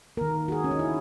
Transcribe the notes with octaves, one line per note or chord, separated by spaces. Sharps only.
D#3 A#3 A#4
F#4
G#4
C#4
D#4
E4